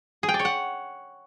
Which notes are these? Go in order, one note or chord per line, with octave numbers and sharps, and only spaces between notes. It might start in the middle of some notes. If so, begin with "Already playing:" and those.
G#4
G5
D5
C#5
F#5